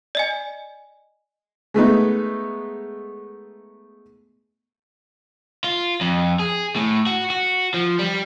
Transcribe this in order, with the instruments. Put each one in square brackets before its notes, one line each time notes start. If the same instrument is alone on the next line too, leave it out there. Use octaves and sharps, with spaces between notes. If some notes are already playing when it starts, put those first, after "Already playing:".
[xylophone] D5 D#5 G#5
[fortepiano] G#3 A3 B3 D#4
[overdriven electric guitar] F4
F2
G#4
A2
F#4
F#4
F3
G3